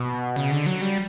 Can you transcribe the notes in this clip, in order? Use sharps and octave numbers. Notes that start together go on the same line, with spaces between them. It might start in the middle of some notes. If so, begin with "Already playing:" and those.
Already playing: B2
C#3
D3
F#3
G3